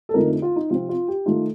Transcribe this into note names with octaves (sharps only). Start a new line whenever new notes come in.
A4
F2 D3 F3 A3 D#4 A#4
F4
D#4
C3 F3 C4 F4
F4
G4
D#3 A3 D#4 F4